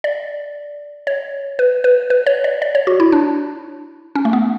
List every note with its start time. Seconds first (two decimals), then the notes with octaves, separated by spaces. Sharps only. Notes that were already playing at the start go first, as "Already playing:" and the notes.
0.04 D5
1.07 C#5
1.59 B4
1.84 B4
2.10 B4
2.26 C#5
2.44 D5
2.62 D5
2.75 C#5
2.87 F#4
3.00 E4
3.12 D4
4.15 C#4
4.25 A3
4.33 B3